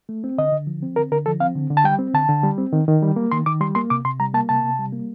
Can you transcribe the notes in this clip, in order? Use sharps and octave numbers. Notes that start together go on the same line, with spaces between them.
A3
C4
D3 D#5
D3
F3
C4
D3 A#4
D3 A#4
F3 A4
C4 F5
D3
D3
A5
G3 G5
C4
D3 A5
D3
G3
C4
D#3
D#3
G3
A#3
D#3 C6
D#3 D6
G3 C6
A#3 C6
C3 D6
C3 C6
G3 A#5
A#3 A5
C3 A5
C3
G3
A#3